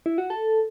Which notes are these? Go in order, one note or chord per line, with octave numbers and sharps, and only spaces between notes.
E4
F#4
A4